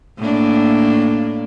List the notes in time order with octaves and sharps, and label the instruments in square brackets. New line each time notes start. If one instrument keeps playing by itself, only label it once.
[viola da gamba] A2 A#3 D4